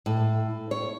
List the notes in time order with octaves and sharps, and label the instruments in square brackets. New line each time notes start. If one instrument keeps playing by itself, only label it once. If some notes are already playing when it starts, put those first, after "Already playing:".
[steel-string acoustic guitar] A2
C#5